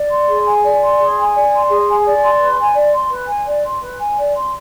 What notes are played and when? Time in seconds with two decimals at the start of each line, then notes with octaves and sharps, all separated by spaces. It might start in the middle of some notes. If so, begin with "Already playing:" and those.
Already playing: D5
0.09 C6
0.28 G#4
0.44 G#5
0.63 D5
0.81 C6
0.98 G#4
1.16 G#5
1.34 D5
1.51 C6
1.69 G#4
1.87 G#5
2.04 D5
2.22 C6
2.39 B4
2.57 G#5
2.75 D5
2.93 C6
3.10 B4
3.28 G#5
3.45 D5
3.63 C6
3.81 B4
3.99 G#5
4.17 D5
4.35 C6